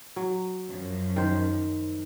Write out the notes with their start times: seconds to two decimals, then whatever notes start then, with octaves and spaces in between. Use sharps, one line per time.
0.16 F#3
0.68 F#2 F3
1.16 D#3 C5